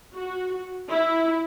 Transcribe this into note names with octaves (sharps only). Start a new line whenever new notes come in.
F#4
E4